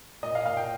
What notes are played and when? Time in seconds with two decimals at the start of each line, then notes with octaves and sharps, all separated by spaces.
0.23 A#2 D#5
0.35 F5
0.46 A#2 F5
0.57 G5